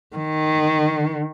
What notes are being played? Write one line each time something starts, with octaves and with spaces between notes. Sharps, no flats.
D#3